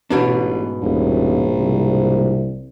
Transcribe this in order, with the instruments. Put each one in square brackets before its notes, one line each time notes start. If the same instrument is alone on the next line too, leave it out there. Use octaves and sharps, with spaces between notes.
[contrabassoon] A1 [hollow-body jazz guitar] G#2 B2 D4
[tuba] D#1 [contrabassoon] A#1
[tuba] C2